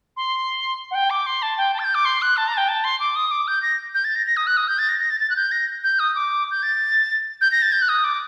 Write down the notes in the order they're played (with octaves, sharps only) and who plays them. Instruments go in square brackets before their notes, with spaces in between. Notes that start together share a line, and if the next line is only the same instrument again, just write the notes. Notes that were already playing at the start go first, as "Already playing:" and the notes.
[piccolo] C6
F#5
G5
D6
C6
A5
G5
A5
A6
G6
D6
C6
F#6
A5
A#5
A5
G5
A5
C6
D6
D#6
D6
G6
A#6
G6
A6
A#6
A#6
D#6
F#6
D#6
G6
A6
A#6
A#6
A6
A6
F#6
G6
A#6
G6
D#6
D6
G6
A6
G6
A#6
A6
G6
F#6
D#6
D6